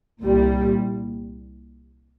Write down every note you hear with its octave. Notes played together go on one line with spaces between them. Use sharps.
C2 A#2 G3